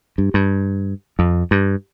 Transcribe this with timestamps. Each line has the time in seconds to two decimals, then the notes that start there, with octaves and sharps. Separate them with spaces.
0.18 G2
0.34 G2
1.19 F2
1.51 G2